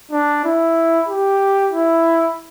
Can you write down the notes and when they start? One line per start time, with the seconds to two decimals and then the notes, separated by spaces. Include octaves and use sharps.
0.12 D4
0.44 E4
1.08 G4
1.71 E4